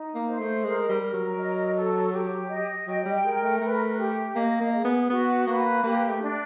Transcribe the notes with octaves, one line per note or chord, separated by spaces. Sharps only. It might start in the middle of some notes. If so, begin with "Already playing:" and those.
Already playing: D#4
A#3
C5
A3
G#3 A#4
G3
A#4
F#3
D#5
A4
G4
D#5
F#3 G5
G3
G#3 A#4
A3
A3 B4
G4
A#3 D#5
A#3
G#4
B3
B3 F#4
A#3 B4
A#3 G4
A3
D4